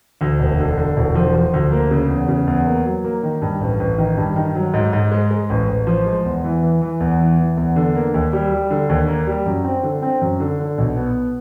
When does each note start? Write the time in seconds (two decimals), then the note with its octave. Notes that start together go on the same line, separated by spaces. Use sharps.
0.21 D2
0.40 E1
0.59 D3
0.77 D3
0.97 E1
1.15 F3
1.35 F3
1.53 D2
1.72 A#3
1.91 C#3
2.09 E2
2.28 C#3
2.47 E2
2.67 A#3
2.85 F#3
3.04 A#3
3.23 D#3
3.42 G2
3.61 A1
3.80 A1
3.98 D#3
4.17 G2
4.36 D#3
4.55 F#3
4.74 G#2
4.93 G#2
5.11 G#3
5.31 G#3
5.50 A1
5.68 A1
5.87 F3
6.06 G#3
6.25 E2
6.44 E3
6.62 E3
6.81 E3
7.00 E2
7.19 E3
7.39 E3
7.57 E2
7.76 D3
7.95 A#3
8.14 D#2
8.33 G3
8.52 G3
8.70 D3
8.89 D#2
9.08 A#3
9.27 G3
9.46 F#2
9.64 C4
9.83 D3
10.02 C4
10.21 F#2
10.40 D3
10.59 D3
10.78 B1
10.96 B3